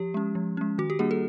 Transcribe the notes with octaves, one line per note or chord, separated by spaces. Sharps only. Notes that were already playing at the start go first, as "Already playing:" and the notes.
Already playing: F3 G4
G#3 C#4
F3
G#3 C#4
D#3 F#4
G4
G3 A#3 D4 G#4
A4